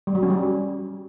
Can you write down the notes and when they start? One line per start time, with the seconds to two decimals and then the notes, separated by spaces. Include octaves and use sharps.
0.07 G3
0.15 F#3
0.23 C#4
0.30 G3